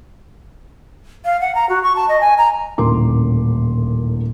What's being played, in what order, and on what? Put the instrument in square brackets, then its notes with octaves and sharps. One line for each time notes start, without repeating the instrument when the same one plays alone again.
[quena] F5
F#5
A#5
F#4
C#6
A5
D#5
G#5
A#5
[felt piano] D#1 A1 D2 A#4 C6 D6